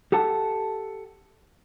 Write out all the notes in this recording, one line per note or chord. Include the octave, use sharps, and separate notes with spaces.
G4 A4 F#5 A5